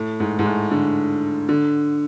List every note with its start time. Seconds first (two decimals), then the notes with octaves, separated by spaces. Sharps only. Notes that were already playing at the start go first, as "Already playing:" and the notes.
Already playing: A2
0.20 G#2
0.39 G#2
0.46 A2
0.71 D3
1.49 D3